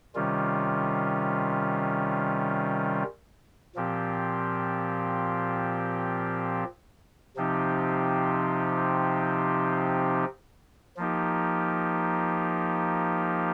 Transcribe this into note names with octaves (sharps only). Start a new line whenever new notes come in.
C3 D#3 G3 C#4 F4
A#2 F3 C4 G4
C3 F3 C4 D#4 G4
F3 A#3 D#4 G4